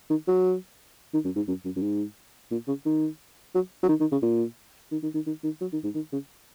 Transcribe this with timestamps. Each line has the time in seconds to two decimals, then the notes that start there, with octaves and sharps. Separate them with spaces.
0.10 D#3
0.28 F#3
1.14 D#3
1.25 F#2
1.36 G#2
1.48 F#2
1.65 F#2
1.76 F#2
1.82 G#2
2.51 A#2
2.68 C#3
2.86 D#3
3.55 F#3
3.83 F#3
3.89 D#3
4.00 D#3
4.12 C#3
4.23 A#2
4.92 D#3
5.03 D#3
5.14 D#3
5.27 D#3
5.44 D#3
5.61 F#3
5.73 D#3
5.84 G#2
5.95 D#3
6.12 C#3